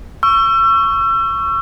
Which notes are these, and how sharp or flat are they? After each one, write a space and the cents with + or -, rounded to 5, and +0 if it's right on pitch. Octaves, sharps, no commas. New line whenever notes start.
C#6 +5 E6 +35